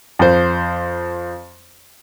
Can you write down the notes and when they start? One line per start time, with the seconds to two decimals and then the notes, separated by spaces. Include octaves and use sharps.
0.19 F2 C5